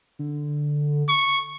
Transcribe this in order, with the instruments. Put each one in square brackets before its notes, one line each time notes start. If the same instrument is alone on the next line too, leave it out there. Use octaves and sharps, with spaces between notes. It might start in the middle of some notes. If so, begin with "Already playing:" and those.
[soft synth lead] D3
[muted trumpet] C#6